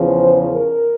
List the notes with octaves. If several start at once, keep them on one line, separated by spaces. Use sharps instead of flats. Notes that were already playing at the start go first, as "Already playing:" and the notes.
Already playing: E2 C#3 F3
C5
A#4